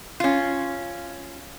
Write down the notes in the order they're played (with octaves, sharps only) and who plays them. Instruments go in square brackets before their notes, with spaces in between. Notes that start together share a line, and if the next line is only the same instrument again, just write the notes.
[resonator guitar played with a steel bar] C#4 F4